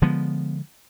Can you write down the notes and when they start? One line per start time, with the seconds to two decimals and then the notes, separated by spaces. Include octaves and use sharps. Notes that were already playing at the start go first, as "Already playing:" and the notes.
0.02 D3 F3 G#3 B3